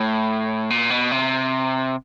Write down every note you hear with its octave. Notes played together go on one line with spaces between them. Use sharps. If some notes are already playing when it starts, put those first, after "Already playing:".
Already playing: A2
A#2
B2
C3